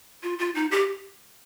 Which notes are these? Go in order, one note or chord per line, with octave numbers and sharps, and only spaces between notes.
F4
F4
D#4
G4